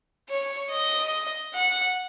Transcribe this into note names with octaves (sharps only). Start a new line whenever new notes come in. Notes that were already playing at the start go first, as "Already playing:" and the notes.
C#5
D#5
F#5